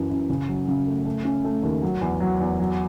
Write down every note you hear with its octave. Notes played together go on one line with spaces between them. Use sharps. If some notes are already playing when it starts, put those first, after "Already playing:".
Already playing: F#2 E3 E4
F#2
C#3
F#3
C#3
A3
A3
C#4
A3
D#2
F#3
E2
F#3
E2
F#3